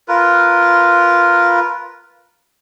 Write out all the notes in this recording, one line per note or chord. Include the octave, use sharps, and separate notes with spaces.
F4 A#4 B4